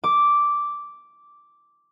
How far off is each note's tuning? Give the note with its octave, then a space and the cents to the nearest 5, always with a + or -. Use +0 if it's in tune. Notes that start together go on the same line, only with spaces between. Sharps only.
D6 -5